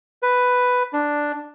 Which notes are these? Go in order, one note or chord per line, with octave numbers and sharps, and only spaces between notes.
B4
D4